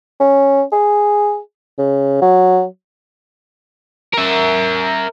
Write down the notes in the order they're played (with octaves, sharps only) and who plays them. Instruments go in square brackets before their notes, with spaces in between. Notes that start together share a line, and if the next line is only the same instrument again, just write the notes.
[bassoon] C#4
G#4
C#3
F#3
[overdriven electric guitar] A#4 E5